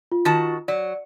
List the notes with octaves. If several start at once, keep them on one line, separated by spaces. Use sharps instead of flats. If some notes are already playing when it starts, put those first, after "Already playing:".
F4
D#3 F#4 A5
F#3 D5